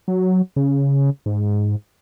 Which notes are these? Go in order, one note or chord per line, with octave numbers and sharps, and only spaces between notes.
F#3
C#3
G#2